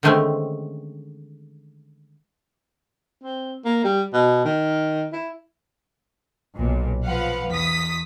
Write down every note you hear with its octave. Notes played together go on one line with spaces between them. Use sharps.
D3 D#3 G#3 A3 C4 C#4
C4
A#3
G3
B2
D#3
E4
B1 A#2
F3 B4 F5 F#5
E2 D#6 B6